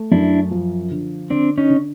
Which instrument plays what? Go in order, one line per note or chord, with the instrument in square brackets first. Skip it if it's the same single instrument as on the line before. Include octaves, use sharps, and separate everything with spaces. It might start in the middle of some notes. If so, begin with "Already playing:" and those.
Already playing: [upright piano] A3
[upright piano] F#2 [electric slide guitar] D4 E4
[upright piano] F3
D3
[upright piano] D3 [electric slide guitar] C4 D4
[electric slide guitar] C#4 D#4
[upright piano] D3